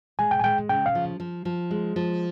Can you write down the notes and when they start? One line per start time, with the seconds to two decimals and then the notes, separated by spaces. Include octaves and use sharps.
0.19 G#3 G#5
0.31 G5
0.39 G#5
0.44 G#3 G5
0.69 C#3 G5
0.86 F5
0.95 F3
1.20 F3
1.45 F3
1.71 G#3
1.96 F3